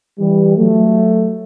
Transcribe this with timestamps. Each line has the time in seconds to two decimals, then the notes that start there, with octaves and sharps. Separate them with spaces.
0.19 E3 G3
0.57 F#3 A3